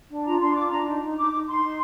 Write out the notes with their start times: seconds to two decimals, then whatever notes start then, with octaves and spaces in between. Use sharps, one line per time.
0.09 D4
0.25 F4 A#5
0.40 D4 C6
0.55 F4 D6
0.71 D4 A#5
0.86 D#4
1.02 D#4
1.16 D#4 D6
1.32 D#4
1.47 D#4 C6
1.62 D#4